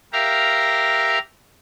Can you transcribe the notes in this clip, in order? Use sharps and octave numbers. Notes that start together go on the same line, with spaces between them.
G4 A#4 E5 F5 A#5